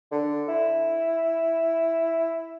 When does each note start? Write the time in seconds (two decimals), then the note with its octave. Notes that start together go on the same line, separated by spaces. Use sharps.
0.12 D3
0.48 E4